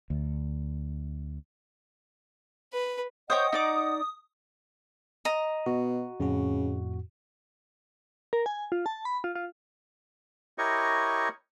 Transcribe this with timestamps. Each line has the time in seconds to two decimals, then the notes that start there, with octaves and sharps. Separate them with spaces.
0.10 D2
2.73 B4
3.30 C5 C#5 D#5 F#5 G5 D#6
3.53 D#4 D5 D6
5.25 D#5 A#5
5.66 B2 F#4
6.20 F2 A2 C#3 F#4
8.33 A#4
8.46 G#5
8.72 F4
8.86 A5
9.05 B5
9.24 F4
9.35 F4
10.58 E4 G4 A#4 C#5 D#5 C#6